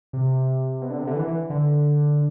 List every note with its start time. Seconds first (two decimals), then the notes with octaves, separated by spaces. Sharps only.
0.13 C3
0.82 B2
0.90 D3
0.98 C3
1.07 D3
1.16 E3
1.27 E3
1.50 D3